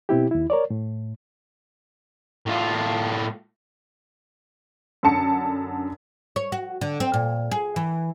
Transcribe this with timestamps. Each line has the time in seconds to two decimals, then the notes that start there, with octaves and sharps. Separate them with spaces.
0.09 B2 C4 E4 G4
0.31 D#2 E4
0.50 A#4 C#5 D5
0.70 A2
2.46 A2 F4
5.03 F#2 D3 A5 C#7
6.36 C#5
6.52 F#4
6.81 D3
7.00 C4
7.14 A#2
7.51 G#4
7.76 E3